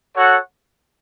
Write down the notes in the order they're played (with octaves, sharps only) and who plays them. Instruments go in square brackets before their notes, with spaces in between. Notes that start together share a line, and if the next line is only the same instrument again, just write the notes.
[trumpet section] F#4 A4 C#5 F#5